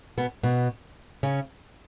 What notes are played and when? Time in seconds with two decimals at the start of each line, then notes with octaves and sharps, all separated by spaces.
0.18 B2 B3
0.43 B2 B3
1.23 C#3 C#4